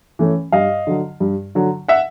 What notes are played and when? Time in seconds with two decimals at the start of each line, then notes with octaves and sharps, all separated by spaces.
0.19 E3 A3 C#4
0.52 G2 D#5 F5
0.87 D3 F#3
1.20 G2
1.55 D3 F#3
1.88 E5 F#5